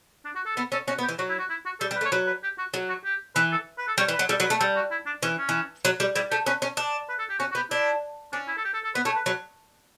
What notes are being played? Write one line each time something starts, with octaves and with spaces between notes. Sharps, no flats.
D4
F#4
A4
B3 A4
C#4 A4
C#4 F#4
B3
G4
E3
F#3 F#4
E4
F#4
E4
F#4
G3 A4
G3
B4
A3
C#5
F#3 B4
B4
G4
F#4
F#3
F#4
G4
E3 B4
A4
B4
A4
G3 C#5
E3
B4
F#3
G3 A4
F#3
B4
A3
G3 A4
F#4
E4
D4
E3 C#4
C#4
E3
F#3
G3
G3 E4
A3 G4
C#4 B4
C#4
D4
B4
A4
G4
C#4 F#4
F#4
B3 G4
D4 E4
C#4 D4
E4
A4
G4
A4
A4
B3 B4
A3 C#5
B4
F#3 B4